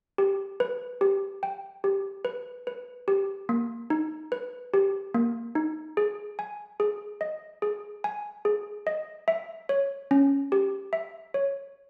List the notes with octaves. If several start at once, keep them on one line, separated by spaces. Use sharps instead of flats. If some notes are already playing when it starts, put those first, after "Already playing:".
G4
B4
G4
G5
G4
B4
B4
G4
A#3
D#4
B4
G4
A#3
D#4
G#4
G#5
G#4
D#5
G#4
G#5
G#4
D#5
E5
C#5
C#4
G4
E5
C#5